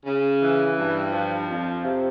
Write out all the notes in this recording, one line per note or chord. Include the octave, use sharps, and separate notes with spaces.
C#3
E3
G2
F3
F2
C3